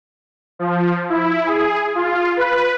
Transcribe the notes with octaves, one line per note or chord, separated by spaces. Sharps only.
F3
E4
G#4
F4
B4